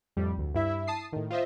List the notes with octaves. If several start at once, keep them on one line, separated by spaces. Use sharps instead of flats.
F2 A2 G3
D2
G2 E4 E5
A5 D#6 C7
A2 D#3
F4 C5 D#5 E5